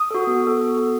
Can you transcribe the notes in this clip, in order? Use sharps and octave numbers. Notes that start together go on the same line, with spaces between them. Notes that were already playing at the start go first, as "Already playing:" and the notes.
Already playing: D#6
F#4 A4
B3
F#4 A4
B3
F#4 A4